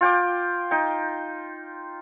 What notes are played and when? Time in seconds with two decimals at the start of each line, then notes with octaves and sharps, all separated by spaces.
0.01 F4 G5 D6
0.71 D#4 G5